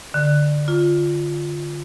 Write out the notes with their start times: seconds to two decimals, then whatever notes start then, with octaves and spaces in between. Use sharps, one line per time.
0.14 D3
0.68 F4